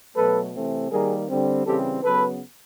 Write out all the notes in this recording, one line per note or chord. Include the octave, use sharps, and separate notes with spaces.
B2 F#3 A3 A4 B4
C3 E3 A3 C4
D#3 G3 A#3 G#4 A#4
D3 G3 C4
C#3 E3 G3 C4 G4 A4
C#3 F#3 B3 A4 B4